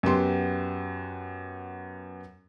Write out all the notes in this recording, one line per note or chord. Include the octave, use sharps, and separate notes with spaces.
F#2 B3 G4 C6